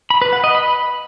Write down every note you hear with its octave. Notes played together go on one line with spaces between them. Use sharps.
B5
B4
F#5
D#5
B5